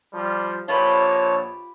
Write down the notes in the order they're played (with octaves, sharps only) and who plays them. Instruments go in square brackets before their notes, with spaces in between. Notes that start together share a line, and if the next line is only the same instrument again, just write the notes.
[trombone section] F3 G3
[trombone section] A#1 [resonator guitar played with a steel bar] F4 G4 B4 [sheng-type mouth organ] C#5 A5